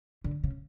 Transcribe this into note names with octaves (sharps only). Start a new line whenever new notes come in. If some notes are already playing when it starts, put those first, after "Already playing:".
D3
C#3